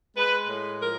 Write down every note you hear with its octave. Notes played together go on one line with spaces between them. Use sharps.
G#3 B4
A2
F3 A#4